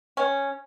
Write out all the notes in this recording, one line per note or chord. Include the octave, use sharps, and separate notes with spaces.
C#4